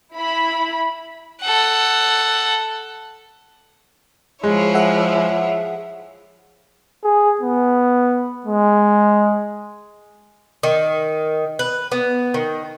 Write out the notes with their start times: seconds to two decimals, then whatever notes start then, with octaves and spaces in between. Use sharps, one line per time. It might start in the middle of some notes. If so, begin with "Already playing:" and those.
0.15 E4 B5
1.42 A4 F#5
4.43 F3 G#3 E4 C#5
4.74 G#4 E5 F#5
7.04 G#4
7.41 B3
8.46 G#3
10.63 D#3
11.59 B4
11.92 B3
12.34 D#3